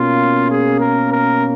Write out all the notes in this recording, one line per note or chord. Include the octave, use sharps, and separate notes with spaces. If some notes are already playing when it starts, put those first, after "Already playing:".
Already playing: B2 A#3 C#4 F4
G#4
A#4
A#4